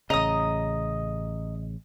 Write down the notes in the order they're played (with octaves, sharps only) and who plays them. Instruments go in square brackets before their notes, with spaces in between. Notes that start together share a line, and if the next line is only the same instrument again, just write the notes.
[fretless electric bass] A1 C#3 [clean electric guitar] D#5 [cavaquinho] A#5 D#6